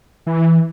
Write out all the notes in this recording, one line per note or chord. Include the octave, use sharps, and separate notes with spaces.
E3